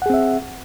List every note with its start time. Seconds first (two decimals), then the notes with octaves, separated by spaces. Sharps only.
0.02 F#5
0.06 G#4
0.10 C4
0.14 E5